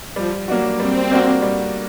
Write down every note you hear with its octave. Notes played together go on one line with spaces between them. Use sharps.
F3 G3
F#3 A#3 D4 F#4
G3 C4
A#3 D4 F#4
G3